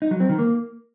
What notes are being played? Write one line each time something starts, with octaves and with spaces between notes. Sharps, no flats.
D#4
F#3
C4
D#3
A#3